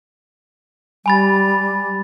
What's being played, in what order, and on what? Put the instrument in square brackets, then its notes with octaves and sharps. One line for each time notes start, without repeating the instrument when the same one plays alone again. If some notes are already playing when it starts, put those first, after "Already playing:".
[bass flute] G3 [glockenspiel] G#5 B5 A6